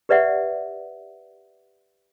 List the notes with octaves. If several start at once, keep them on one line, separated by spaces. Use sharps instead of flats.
G4 B4 D5 E5 F#5